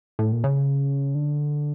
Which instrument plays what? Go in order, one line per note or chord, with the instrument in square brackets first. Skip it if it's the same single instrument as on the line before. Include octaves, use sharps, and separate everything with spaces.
[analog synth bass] A2
A#2
C#3
D3